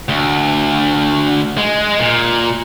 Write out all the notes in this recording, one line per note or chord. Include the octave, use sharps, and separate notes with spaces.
D2
G#3
A#2